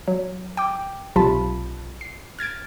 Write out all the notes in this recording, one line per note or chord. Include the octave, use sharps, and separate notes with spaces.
F#3
G5 D6
B1 C3 F4 A5 B5
C7
F6 G#6 A6 D7